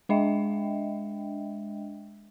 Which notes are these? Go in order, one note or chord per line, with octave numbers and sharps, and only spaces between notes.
G#3 D4 D#5 E5 G5